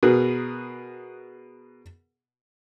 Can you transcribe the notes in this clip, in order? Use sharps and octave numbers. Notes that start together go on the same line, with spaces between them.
B2 G#4 A#4 B4